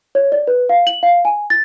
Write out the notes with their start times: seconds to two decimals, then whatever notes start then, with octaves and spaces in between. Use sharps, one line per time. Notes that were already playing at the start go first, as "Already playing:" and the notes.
0.15 C#5
0.32 D5
0.47 B4
0.69 F5
0.87 F#7
1.03 F5
1.25 G#5
1.50 A6